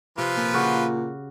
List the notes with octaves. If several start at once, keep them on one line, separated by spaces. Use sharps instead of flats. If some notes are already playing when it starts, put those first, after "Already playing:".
C3 F3 F4 B4
A#2
C#3 F#4 G4